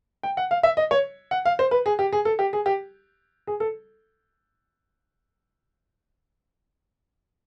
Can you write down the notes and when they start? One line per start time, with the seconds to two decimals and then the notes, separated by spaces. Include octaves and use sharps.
0.23 G5
0.37 F#5
0.51 F5
0.63 E5
0.77 D#5
0.91 C#5
1.31 F#5
1.45 F5
1.59 C5
1.71 B4
1.86 G#4
1.99 G4
2.13 G#4
2.25 A4
2.39 G4
2.53 G#4
2.66 G4
3.47 G#4
3.60 A4